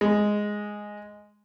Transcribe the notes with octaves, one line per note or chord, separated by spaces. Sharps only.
G#3